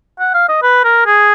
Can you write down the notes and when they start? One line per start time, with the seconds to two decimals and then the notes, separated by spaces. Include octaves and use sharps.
0.20 F#5
0.34 F5
0.49 D#5
0.63 B4
0.84 A#4
1.06 G#4